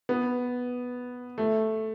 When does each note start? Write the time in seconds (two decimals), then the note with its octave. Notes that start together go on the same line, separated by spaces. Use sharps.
0.09 B3
1.38 A3